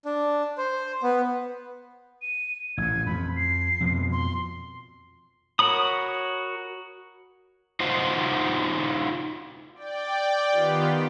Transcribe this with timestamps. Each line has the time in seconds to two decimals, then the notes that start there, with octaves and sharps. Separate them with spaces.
0.05 D4
0.58 C5
1.03 B3
2.22 D#7
2.77 A1 A#2 G#6
3.06 F2 B5
3.36 C7
3.81 F2 B2 F3
4.12 C6
5.59 F#4 A#4 C#5 B5 D#6
7.80 D#4 F4 F#4 C5
9.75 D5 G5
10.51 D#3 B3 F4 G4